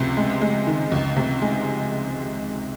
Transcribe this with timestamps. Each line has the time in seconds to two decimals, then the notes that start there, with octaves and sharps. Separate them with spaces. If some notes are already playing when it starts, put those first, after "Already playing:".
Already playing: C#2 C3
0.17 G#3
0.41 G#3
0.67 D#3
0.92 C#2
1.16 C3
1.42 G#3